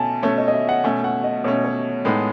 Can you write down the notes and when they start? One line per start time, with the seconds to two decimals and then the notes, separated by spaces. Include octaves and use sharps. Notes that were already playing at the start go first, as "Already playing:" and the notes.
Already playing: B2 A3 C#4 G#5 A5
0.23 B2 A3 C#4 C#5
0.38 D#5
0.48 D#5
0.54 E5
0.69 F#5
0.84 B2 A3 C#4 G#5
1.04 F#5
1.24 D#5
1.44 B2 A3 C#4 C#5
1.65 C#5
2.05 A2 G#3 B3 D#4 A4